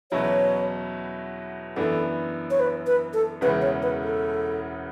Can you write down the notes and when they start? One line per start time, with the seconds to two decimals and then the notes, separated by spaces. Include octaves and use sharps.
0.11 E2 B2 F#3 C#4 E4 C#5
1.76 F#2 E3 B3 D4 A4
2.51 C#5
2.60 B4
2.87 B4
3.14 A4
3.41 E1 E2 C#3 E3 B4
3.62 C#5
3.82 B4
4.04 A4